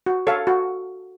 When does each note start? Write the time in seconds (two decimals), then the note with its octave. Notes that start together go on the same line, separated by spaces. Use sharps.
0.06 F#4
0.27 A4 C#5 F5
0.47 F#4